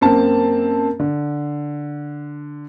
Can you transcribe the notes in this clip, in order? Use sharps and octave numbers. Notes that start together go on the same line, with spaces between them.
F#2 A#3 C4 A5
D3